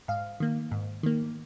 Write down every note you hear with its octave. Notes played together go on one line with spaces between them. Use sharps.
G#2 F5
D#3 A#3
G#2
D#3 A#3